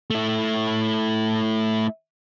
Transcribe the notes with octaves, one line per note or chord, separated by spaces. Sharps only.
A3 E4